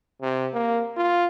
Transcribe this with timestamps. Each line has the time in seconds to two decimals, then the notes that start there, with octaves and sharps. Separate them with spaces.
0.21 C3
0.53 A#3
0.97 F4